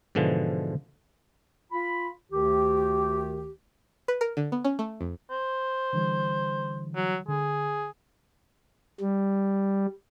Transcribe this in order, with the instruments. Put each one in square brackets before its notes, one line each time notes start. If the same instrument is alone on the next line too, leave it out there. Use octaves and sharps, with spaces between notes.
[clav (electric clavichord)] G#2 B2 D3 E3 F3
[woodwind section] F4 B5
D2 D#3 G4
[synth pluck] B4
A#4
D3
B3
C#4
A3
F2
[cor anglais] C5
[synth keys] D3 E3 G3
[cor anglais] F#3
[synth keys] D3 [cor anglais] G#4
[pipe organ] G3